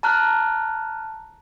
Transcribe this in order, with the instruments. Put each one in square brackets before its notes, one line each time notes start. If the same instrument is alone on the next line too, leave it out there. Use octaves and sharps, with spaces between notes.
[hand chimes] A5 A#5 F6 F#6